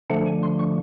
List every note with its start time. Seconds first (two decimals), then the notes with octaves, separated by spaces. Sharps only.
0.10 D3 F3 A3 D4 F#5
0.26 G#5
0.43 C6
0.59 C#6